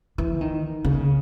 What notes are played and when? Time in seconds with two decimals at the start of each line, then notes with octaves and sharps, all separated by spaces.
0.18 E3
0.41 D#3
0.85 C#3